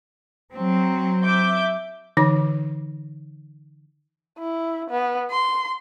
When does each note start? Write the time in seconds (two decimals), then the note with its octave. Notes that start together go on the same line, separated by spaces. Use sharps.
0.53 F#3 C4
1.23 E5 D6 G6
2.17 D3 E3 D#4 D6
4.38 E4
4.90 B3
5.31 C6